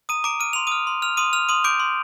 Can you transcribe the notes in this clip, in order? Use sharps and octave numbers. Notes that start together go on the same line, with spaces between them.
A#5 D#6 D#7
A#5 D6 D7
F6 D#7
C6 F7
D#6 F6 D#7
C6
F6 F7
C6 D#6 D#7
F6 F7
C6 D#6 D#7
D6 G6 D7
C6